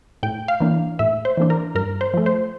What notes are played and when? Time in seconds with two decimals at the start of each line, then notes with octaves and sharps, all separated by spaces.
0.23 A2 G5
0.48 F5
0.60 E3 A#3 D4
0.99 A2 E5
1.25 C5
1.37 E3 A#3 D4
1.50 A#4
1.75 G2 A#4
2.01 C5
2.14 F3 A3
2.26 C5